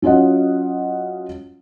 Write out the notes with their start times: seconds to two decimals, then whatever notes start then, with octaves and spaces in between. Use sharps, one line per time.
0.02 F#3 C#4 F4 D#5 F#5